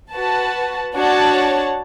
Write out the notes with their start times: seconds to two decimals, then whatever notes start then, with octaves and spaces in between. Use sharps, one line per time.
0.12 F#4 B4 F#5 A5
0.94 D4 F#4 C#5 F#5 A5